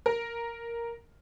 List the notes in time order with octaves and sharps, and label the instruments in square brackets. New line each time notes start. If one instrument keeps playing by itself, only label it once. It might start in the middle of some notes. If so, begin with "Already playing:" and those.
[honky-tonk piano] A#4